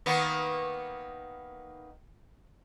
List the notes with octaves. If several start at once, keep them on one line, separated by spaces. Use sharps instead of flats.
D#3 A#3 B3